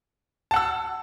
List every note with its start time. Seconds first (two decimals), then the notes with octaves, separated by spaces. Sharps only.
0.51 A5
0.54 F#5
0.56 E6